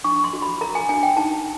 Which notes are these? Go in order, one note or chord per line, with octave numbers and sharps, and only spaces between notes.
D4 C#6
C6
F#4
B5
A#4 A#5
G#5
D4 G#5
G5
D#4 A5